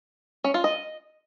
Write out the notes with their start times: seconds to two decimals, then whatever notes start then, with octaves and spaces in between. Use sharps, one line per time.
0.44 C#4
0.54 F4
0.64 D#5